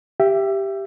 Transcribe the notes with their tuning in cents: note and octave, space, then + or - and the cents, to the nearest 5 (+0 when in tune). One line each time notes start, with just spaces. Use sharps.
G4 +0 E5 +25